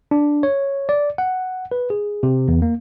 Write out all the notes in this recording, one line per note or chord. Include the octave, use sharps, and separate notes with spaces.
D4
C#5
D5
F#5
B4
G#4
C3
E2
A#3